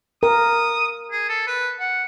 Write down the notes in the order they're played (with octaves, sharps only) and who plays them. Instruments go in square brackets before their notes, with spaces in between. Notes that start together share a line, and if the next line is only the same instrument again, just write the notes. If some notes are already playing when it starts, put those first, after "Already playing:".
[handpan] A#4 [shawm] D#6
[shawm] G#4
A4
B4
F#5